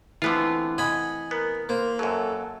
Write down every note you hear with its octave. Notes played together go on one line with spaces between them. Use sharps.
D3 E3 A3 B3 C4 F4
D#5 F#5 G#5 B5
B3 A#4
A#3 C5
F#2 F#3 A4